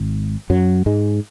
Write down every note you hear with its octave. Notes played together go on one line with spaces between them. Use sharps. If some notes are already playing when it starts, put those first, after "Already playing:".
Already playing: G#1 G#2
F#2 F#3
G#2 G#3